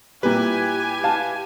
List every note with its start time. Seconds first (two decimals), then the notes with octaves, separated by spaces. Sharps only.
0.23 A#2 G3 E4 G4 B4 G#5
1.04 F5 A5